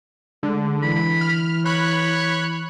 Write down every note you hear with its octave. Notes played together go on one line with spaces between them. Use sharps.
D3 G#3
E3 B5
F6
C#5 B5 F#6